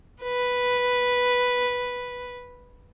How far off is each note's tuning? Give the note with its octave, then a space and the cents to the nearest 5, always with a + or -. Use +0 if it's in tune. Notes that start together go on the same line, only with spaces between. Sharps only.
B4 -5